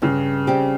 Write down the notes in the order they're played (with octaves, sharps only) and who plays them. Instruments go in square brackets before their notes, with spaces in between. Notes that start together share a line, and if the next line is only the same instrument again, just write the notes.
[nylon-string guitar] G2 [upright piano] C#3
[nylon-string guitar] G3 C4 G4